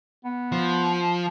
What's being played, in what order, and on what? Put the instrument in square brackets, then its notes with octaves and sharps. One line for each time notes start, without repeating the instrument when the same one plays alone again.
[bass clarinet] B3
[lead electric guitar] F3